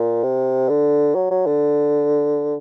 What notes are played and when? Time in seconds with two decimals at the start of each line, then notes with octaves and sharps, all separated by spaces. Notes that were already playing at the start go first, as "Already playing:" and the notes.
Already playing: A#2
0.23 C3
0.69 D3
1.15 F#3
1.31 F#3
1.47 D3